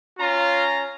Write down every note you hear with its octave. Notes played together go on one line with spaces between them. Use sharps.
C#4 F4 A#5